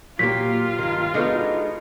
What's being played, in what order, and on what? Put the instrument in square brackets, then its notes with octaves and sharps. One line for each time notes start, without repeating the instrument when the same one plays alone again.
[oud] A#2 [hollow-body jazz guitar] F#3 A#3 G4 [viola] F4 [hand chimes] B6
[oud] G2 D#3
[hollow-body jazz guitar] G#3 B3 F#4 [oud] D4 D#4 A4